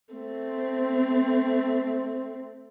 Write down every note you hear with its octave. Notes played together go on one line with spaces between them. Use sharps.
A3 C4